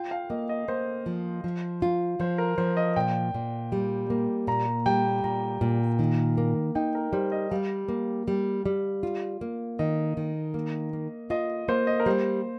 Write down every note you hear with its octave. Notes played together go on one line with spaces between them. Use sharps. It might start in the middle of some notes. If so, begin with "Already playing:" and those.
Already playing: F4 G5
F5
A#3 D#5
D#5
A#3 C5
F3
F3
F4
F3 C5
A#4
F3 C5
D#5
A#2 G5
A#2
G3
A#3
A#2 A#5
G3 G5
A#2 A#5
A#2
D#3
A#3
D#4 G5
A#4
G3 C5
D#5
G3 F5
A#3
G3
G3
F4
A#3
D#3 D#5
D#3
A#3
A#3
F4 D#5
A#3 C5
D#5
A#4
G3 C5